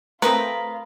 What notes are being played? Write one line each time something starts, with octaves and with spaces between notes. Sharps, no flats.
A3 C4 F4 A#4 B4 A#5 D#6